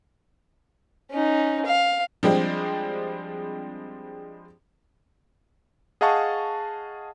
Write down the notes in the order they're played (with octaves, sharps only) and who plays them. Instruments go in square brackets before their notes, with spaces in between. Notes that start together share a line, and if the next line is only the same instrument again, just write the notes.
[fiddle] C#4 D#4
F5
[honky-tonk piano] F3 G3 G#3 C4 D4
[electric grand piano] G#4 D#5 F5 F#5 A5 C#6